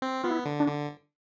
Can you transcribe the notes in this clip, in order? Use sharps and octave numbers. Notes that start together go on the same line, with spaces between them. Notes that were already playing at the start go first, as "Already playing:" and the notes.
C4
B3 F4
E4
D3
D4
D3